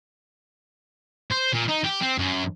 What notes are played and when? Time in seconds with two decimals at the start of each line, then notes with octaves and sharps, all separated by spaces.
1.32 C5
1.54 A#2
1.69 D#4
1.85 G4
2.02 C4
2.19 F#2